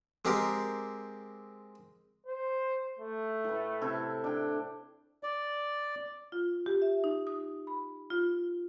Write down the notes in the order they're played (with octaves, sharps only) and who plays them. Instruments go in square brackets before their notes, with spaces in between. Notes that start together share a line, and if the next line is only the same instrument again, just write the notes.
[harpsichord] G#3 C4 G4 A#4
[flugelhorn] C5
A3
[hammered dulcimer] A2 B4
C3 E4 A4
D4 G5
[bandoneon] D5
[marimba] F4
G4
E5
D#4
D#6
B5
F4